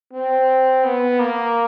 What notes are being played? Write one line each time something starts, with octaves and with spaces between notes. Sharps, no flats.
C4
B3
A#3